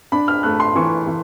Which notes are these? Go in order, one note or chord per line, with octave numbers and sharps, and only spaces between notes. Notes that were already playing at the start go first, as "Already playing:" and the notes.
D4 B5
F6
A3 F#6
C6
E3 C#6
E3